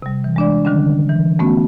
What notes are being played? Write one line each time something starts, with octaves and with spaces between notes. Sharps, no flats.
C3 G3
E3
G#3 D4 D5
D3 D#3 G3 C#4 D4
E3
A3 B3 C#4 F#4